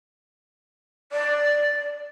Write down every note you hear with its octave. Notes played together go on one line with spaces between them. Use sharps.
D5